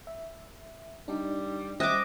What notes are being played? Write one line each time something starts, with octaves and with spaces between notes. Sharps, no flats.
E5
G3 D4 D#4
G3 C#4 C5 D#5 E5 D6 G#6